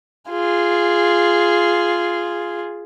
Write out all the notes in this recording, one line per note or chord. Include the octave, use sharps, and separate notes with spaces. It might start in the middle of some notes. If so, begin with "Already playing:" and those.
F4 G#4